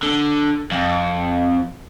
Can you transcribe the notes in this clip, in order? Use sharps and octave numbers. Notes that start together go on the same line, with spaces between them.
D3
F2